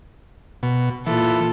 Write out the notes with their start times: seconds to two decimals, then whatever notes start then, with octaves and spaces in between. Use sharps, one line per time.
0.63 B2
1.07 A#2 E3 F4 A4